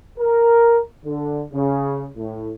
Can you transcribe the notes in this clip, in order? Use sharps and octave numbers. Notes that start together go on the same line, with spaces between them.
A#4
D3
C#3
A2